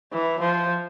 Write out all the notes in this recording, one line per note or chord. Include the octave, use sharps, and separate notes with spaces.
E3
F3